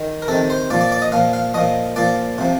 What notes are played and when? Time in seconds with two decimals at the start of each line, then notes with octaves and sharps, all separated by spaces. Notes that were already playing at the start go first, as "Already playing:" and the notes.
Already playing: D#3
0.22 A#4
0.28 C3 D#3 A4
0.50 C5
0.70 A#2 D5
0.73 F3
0.81 D5
0.92 D5
1.02 D#5
1.12 A#2 F3 F5
1.33 F5
1.54 A#2 F3 D#5
1.96 A#2 F3 D5
2.38 C3 F3